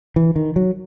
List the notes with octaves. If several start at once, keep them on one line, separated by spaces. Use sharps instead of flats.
E3
D#3
F#3